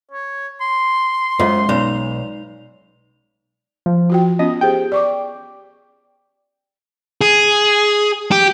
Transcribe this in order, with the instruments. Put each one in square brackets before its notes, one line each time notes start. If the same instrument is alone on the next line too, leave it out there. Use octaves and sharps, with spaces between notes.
[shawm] C#5
C6
[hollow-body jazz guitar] F#2 [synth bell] G#3 [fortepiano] F4 C5 D#5
[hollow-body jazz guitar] B1 [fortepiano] B3 C#4 [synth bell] D#4 D5 F7
[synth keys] F3
[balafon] F4 F#4 G5
[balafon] B3 C#4 F4 [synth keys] D#5
[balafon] G4 G#4 C5 [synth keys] G5
[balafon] D5 C#6 D6
[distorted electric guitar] G#4
G4